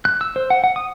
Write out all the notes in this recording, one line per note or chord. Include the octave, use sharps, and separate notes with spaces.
F#6
E6
C5
F#5
F#5
D#6